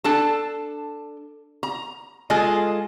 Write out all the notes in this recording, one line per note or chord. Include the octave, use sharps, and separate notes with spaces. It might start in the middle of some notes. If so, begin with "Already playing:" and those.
D4 A4 A5
A#5
G#3 F4 G#4 A4 D#5